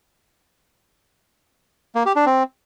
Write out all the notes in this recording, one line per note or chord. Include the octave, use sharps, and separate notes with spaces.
A#3
G4
D4
C4